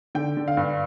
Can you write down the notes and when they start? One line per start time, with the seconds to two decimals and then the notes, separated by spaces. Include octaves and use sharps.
0.15 D3 G5
0.37 D3
0.48 F5
0.57 G2